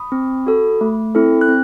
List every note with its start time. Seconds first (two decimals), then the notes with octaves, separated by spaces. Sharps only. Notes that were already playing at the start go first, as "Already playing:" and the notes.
Already playing: B5 D#6
0.12 C4
0.47 F#4 A4
0.81 A3
1.15 C4 E4 A4
1.41 F#6
1.49 C4